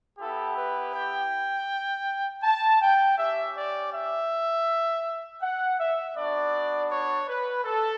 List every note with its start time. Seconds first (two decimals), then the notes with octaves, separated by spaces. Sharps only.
0.19 B3 E4 G4 A4
0.57 B4
0.94 G5
2.43 A5
2.81 G5
3.18 C#4 G4 E5
3.55 D5
3.92 E5
5.42 F#5
5.78 E5
6.16 B3 D4 F#4 D5
6.91 C#5
7.28 B4
7.65 A4